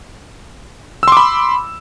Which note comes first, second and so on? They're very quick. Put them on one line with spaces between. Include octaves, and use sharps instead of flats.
E6 C6 D6 B5